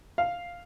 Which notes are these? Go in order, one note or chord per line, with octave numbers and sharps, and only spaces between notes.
F5